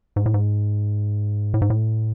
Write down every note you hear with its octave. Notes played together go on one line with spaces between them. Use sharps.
G#2
A2
G#2
A2
G#2
A2